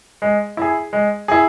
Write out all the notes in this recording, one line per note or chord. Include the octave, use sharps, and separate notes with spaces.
G#3
E4 G#4
G#3
E4 G#4